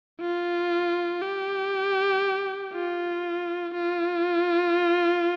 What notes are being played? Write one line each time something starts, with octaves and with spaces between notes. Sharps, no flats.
F4
G4
F4
F4